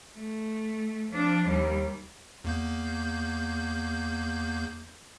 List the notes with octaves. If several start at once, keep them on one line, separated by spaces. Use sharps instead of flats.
A3
F3 D4
D#2 G3
E2 A#3 G6